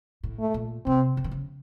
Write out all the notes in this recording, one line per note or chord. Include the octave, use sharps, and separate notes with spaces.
A2
A3
A#2
C3 C4
C#3
D#3
C#3